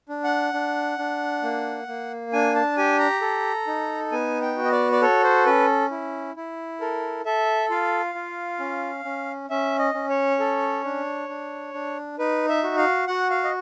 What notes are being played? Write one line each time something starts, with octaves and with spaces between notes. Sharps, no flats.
D4
F#5
D4
D4
A#3
A#3
D4 G#5
A5
G4 G#5
A#5
A4
D#4
B3 G#5
G5
F#4
D#5
D5
D5
A4 C#5
C5
C#4 B4
E4
E4
A4 A#4
A4 E5
F4 F5
F4
C#4
C#4
C#4 E5
D#5
C#4
C#5
A4
D4
D4
D4
D#4 B4
E5
F#4
F5
F#4 F#5
F5
D#5